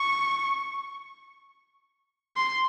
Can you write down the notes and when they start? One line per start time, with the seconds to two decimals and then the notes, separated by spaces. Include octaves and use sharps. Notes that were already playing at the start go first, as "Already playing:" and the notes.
Already playing: C#6
2.37 C6